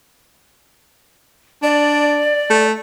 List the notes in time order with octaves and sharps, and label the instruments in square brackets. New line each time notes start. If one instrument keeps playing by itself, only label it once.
[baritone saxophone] D4 [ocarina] D5
[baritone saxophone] A3